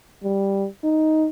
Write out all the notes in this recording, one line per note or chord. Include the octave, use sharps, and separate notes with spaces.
G3
D#4